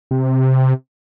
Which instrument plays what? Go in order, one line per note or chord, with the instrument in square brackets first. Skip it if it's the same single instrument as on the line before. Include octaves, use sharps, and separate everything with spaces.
[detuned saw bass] C3